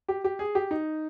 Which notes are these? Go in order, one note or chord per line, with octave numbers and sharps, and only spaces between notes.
G4
G4
G#4
G4
D#4